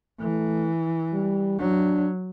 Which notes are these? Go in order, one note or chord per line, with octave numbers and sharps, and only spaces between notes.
E3 A3
G3
F#3 D4